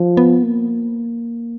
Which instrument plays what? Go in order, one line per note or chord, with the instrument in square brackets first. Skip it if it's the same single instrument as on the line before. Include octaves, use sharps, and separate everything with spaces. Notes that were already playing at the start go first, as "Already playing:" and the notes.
Already playing: [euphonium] F3
[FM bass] B3
A#3